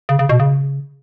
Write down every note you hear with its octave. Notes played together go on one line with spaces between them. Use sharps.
C#3
C#3
B2
C#3